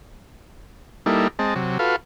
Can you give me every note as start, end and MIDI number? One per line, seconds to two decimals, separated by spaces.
1.06 1.28 55
1.06 1.28 58
1.06 1.28 63
1.06 1.28 64
1.06 1.28 69
1.39 1.54 56
1.39 1.54 60
1.39 1.54 75
1.39 1.54 81
1.55 1.78 48
1.55 1.78 54
1.79 1.96 65
1.79 1.96 66
1.79 1.96 69
1.79 1.96 71
1.79 1.96 77